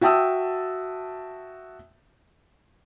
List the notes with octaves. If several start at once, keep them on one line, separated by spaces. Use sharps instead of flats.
F#4 E5 G5 A5 D#6 E6